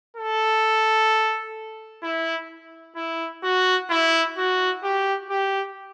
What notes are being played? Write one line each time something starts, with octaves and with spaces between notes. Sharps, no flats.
A4
E4
E4
F#4
E4
F#4
G4
G4